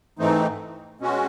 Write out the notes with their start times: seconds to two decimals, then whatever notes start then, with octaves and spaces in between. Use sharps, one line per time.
0.19 G#2 E3 A3 C4 D#4
1.00 B2 G#3 C#4 F#4